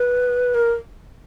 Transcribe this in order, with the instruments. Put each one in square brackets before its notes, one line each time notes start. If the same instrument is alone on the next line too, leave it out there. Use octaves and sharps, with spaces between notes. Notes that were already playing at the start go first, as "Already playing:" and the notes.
Already playing: [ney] B4
A#4